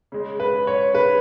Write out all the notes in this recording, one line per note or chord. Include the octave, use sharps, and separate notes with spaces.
C#3 G#3
B4
C#5
B4